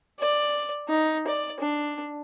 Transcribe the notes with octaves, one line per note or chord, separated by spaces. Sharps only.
D5
D#4
D5
D4